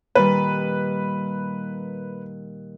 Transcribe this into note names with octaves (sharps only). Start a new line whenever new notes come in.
A#2 D#3 G3 B4